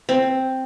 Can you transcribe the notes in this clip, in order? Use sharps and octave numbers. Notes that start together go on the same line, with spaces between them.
C4